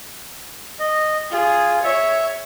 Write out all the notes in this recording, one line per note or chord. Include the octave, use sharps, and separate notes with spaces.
D#5
F4 G#4
C#5 E5